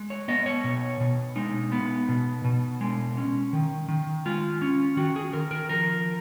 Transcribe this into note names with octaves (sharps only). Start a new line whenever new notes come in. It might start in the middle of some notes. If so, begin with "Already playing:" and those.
Already playing: G#3
C#5
B3 D#5
C#5
B2
B2
G#3 D#4
B3
B2
B2
G#3
C#4
D#3
D#3
G#3 F4
C#4
D#3 F#4
G#4
D#3 A#4
A#4
F3 A#4